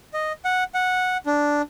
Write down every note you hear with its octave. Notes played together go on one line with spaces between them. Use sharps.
D#5
F#5
F#5
D4